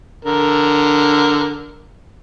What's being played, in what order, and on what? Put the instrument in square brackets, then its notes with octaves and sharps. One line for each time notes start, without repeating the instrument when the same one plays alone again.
[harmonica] D3 A#4